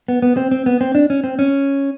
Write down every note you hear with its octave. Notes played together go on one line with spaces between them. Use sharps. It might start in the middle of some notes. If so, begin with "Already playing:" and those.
B3
B3
C4
C4
B3
C4
D4
C#4
C4
C#4